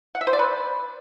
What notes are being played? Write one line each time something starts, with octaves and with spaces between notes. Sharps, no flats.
F#5
E5
C5
D5
B4